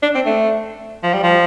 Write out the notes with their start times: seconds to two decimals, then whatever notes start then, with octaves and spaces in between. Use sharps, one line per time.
0.02 D4
0.15 C4
0.25 A3
1.03 F3
1.14 G3
1.23 F3